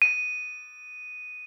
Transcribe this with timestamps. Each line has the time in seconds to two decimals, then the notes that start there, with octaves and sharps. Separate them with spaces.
0.02 D#7